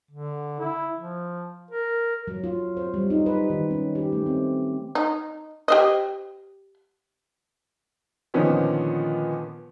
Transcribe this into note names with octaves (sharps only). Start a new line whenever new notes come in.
D3
E4
F3
A#4
F#3
F4
C5
G3
D#4
B4
D#3
C#4
G4
A3
C4
D#4
G4 C5 D#5
A#2 D3 D#3 F3 B3 C#4